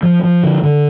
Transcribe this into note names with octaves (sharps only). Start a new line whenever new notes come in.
F3
F3
D3
D3